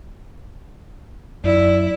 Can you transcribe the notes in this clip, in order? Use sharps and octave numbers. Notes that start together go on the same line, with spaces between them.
F#2 E4 D5